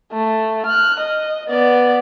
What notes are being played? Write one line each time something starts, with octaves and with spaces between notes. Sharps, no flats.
A3
F6 F#6
D#5
B3 D5